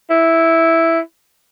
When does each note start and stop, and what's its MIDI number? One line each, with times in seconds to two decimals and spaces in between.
0.10 1.00 64